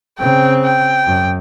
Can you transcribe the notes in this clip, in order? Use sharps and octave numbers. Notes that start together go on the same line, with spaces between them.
C#3 C4 G5
G5
F#2